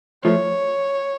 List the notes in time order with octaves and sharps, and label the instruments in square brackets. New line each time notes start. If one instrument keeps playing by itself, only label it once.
[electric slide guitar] F3 A3 [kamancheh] C#5